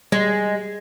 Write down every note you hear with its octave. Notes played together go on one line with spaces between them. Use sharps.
G3 G#3